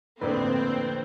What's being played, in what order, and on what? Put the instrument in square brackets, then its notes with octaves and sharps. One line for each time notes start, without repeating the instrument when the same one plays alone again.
[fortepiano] A#1 C5 D5 [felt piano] F2 A2 D3 [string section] C4 [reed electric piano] B4